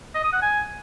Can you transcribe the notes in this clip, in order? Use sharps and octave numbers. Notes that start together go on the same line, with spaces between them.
D#5
D#6
F#5
G#5